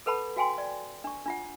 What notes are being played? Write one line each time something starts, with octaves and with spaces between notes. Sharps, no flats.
A4 B4 F#5 A5 B5
F#4 F5 G5 G#5 C6
D5
D4 C#6
D4 F4 F#5